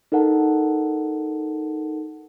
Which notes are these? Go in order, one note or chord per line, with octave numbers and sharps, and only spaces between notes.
D#4 A4 A#4 F#5 A5